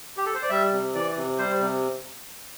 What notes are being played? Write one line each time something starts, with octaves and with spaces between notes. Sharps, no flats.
G4
A4
C5
D5
G3 E5
C3
E3 D5
C3
G3 C5
C3